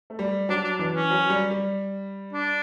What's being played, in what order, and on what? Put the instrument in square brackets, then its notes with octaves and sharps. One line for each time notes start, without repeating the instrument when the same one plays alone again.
[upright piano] A3
G3
[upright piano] F#3 [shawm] D4
[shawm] D4
[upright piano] E3 [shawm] D4
[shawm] C#4
[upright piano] F#3
G3
G3
[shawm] D4